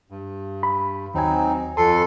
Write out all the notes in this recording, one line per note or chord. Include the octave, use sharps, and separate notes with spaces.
G2
B5
D#2 F#3 C4 D#4 G#5
F2 A4 A5 C6